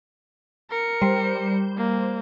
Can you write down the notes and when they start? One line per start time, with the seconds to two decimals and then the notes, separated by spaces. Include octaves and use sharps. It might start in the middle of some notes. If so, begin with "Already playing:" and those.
0.70 A#4 C#7
1.01 G3 C5
1.77 A#3